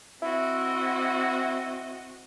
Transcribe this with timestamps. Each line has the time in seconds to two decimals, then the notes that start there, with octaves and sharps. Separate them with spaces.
0.22 C4 E4 F#4 D#5